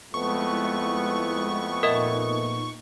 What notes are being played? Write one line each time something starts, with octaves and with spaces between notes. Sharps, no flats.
F2 G#3 A3 B3 E4 C#6
A#2 D#4 A#4 D#5 E5